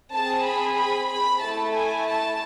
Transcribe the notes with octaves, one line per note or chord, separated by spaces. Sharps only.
C4 G#4 A5
B5
B5
B5
A3 E4 A4 A5
G#5
A5